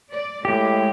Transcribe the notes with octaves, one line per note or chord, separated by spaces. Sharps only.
D5
A2 G#3 G4